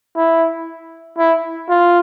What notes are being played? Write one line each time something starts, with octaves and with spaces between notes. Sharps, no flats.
E4
E4
F4